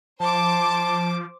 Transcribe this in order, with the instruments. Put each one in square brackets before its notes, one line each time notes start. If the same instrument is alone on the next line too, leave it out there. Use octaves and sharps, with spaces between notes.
[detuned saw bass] F3 [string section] C5 D6 [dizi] A5